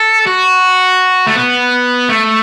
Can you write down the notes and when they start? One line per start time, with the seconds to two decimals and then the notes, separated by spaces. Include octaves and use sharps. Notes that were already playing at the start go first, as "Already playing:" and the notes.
Already playing: A4
0.27 F#4
1.27 A3
1.35 B3
2.09 A3